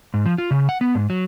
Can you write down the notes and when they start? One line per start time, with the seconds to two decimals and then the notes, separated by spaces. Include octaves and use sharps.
0.14 G#2
0.26 F3
0.38 F4
0.51 C#3
0.69 F#5
0.81 B3
0.95 G#2
1.10 F#3